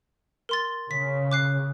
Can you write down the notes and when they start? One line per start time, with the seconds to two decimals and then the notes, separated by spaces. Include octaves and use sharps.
0.49 A#4 C6 A6
0.91 C#3 B6
1.31 D6 F#6 C7